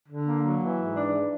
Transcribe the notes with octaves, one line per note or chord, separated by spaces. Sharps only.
D3
A#3
F#3
E3
G#2
D4
E3